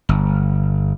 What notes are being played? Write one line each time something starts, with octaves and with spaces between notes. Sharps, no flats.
G1